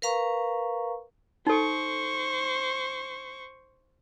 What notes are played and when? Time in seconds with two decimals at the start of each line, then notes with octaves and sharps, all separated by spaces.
0.02 A#4 B4 F5 A#5 C#6
1.47 D#4 A4 C5 C#6